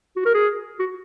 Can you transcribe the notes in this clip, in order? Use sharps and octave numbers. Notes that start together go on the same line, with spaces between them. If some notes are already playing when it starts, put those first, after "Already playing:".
F#4
A#4
G#4
F#4